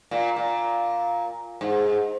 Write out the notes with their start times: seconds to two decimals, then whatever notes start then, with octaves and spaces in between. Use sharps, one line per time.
0.11 A#2
0.36 A#2
1.61 G#2